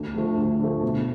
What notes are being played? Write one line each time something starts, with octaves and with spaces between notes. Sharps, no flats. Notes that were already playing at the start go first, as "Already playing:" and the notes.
Already playing: D2
D3 F3 A3
D2
D3 F3 A3
B2